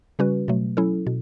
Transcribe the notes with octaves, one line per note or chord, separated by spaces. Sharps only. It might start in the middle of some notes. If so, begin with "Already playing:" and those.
C#3 G3 C#4 F#4 B4
B2 F#3 A3
F#3 C#4 E4 A4
B2